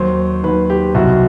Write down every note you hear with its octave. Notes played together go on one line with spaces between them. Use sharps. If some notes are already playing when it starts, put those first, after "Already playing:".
Already playing: D#2 D#3 F#3 C5
D#2 D#3 F#3 B4
G4
C2 B2 F#3 F#4